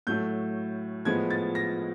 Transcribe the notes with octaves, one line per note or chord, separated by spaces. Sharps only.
A2 F#3 A3 G6
A2 F3 G#3 B3 G#6
A6
A#6